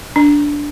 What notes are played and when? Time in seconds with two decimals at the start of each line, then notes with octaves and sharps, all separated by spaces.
0.16 D4